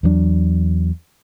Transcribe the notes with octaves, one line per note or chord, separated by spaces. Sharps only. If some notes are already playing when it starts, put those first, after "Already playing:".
E2 G2 F#3 D4